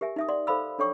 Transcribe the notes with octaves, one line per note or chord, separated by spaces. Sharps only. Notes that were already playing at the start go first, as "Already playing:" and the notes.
G4 A#4 E5 G#5
D#4 E5 D#6
D5 F#5 C6
A4 C5 F5 B5 E6
D4 A4 C#5 G5 C#6 D6